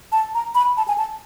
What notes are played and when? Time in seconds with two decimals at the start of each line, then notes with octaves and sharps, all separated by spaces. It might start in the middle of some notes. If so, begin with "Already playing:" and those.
0.12 A5
0.35 A#5
0.55 B5
0.77 A5
0.88 G#5
0.98 A5